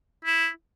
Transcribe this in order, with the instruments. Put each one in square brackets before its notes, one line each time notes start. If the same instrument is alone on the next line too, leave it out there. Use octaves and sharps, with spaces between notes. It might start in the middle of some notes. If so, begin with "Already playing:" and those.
[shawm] E4